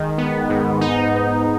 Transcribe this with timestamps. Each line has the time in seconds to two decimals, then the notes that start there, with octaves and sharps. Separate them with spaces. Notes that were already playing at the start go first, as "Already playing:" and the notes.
Already playing: D#3 G#3
0.18 B3
0.50 G#2
0.81 D#4